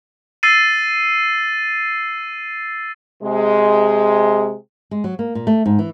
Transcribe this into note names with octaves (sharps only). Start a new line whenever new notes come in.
E6 A6 C7 D#7
C3 G#3
G#3
F#3
A#3
A#2
A3
G#2
E3